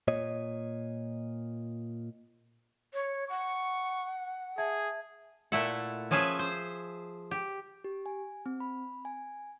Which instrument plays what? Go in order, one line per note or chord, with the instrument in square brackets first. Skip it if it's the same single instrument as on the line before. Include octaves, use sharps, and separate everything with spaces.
[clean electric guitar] A#2 C#5 D#5
[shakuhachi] C#5
[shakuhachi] F#5 [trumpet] C#6
[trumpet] G#4 [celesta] E5 A5 G#6
[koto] A#2 A3 E4 E5 F#5
F3 C#4 G#4 B4 E5 G#5
C5
G4
[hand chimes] G4
G#5
C4
B5
G#5